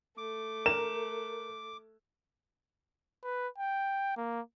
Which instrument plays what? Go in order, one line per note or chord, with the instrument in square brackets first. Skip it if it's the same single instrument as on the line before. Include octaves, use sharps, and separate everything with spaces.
[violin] A3 [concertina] D6
[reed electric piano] A#4 [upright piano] E7
[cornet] B4
G5
A#3